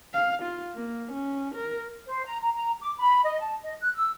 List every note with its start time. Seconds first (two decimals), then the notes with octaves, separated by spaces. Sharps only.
0.13 F5
0.43 F4
0.75 A#3
1.12 C#4
1.55 A#4
2.07 C5
2.25 A#5
2.42 A#5
2.54 A#5
2.80 D6
2.98 B5
3.24 D#5
3.41 A5
3.64 D#5
3.81 F#6
3.96 E6